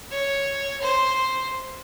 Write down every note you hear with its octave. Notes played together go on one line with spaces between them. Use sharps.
C#5
C5